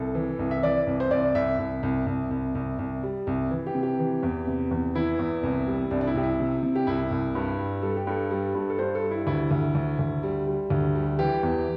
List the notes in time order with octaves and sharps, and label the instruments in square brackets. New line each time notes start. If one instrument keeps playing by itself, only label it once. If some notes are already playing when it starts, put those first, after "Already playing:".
Already playing: [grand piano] C2 A4
E3
C2
E5
E3 D5
C2
C5
C2 D5
C2 E5
C2
C2
C2
C2
C2
C2
G3
C2
E3
G4
C3
G4
E3
E2
C3
E2
E3 E4
E2
C2
G3
C2 D4
D4
E4
C2 G4
E4
C3
C3
G4
C2 E4
C2
G2
G3
G3 A4
G4
G2 A4
G3
G2
A4
G2 C5
A4
G3
E4
D2 E4
D2
D2
D2
G3
G3
D2
G3
E3 G4
E2